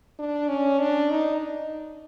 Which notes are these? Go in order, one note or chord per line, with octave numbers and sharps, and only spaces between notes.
D4
C#4
D4
D#4